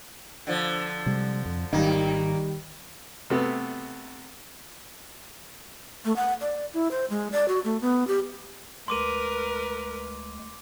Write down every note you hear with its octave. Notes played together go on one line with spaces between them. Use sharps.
D3 F3
C3 G3 G#3
F2
G#1 D#2 D#3 G3 A#3
C3 A3 B3
A3
F#5
D5
E4
C5
G#3
D5
F#4
A3
B3
G4
D2 G#3 A#4 B4 C6 D6 D#7